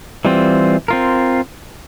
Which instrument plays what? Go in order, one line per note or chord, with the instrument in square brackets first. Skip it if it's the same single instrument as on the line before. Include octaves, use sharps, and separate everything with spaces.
[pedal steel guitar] E3 G3 C4 F4
C4 F4 A#4